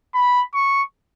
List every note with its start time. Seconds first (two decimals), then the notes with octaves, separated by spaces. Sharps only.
0.15 B5
0.55 C#6